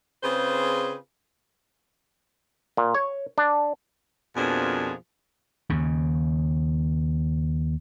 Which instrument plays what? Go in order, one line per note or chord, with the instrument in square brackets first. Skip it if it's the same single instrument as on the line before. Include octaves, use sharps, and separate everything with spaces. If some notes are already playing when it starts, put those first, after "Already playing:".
[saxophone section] C#3 C4 F4 G#4 B4 C5
[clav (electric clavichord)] A#2
C#5
D4
[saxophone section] F2 B2 F3 A#3 D4 G#4
[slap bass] D#2 C#3